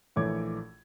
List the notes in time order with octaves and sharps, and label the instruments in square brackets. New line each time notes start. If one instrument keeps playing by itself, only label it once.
[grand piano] A#1 E3 A3 C#5 D6 G#6